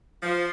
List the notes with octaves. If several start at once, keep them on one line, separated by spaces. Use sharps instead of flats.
F3